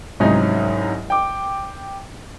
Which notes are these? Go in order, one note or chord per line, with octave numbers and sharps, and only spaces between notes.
C2 G#2 F#3 C#4 D#4 G#4
G5 D6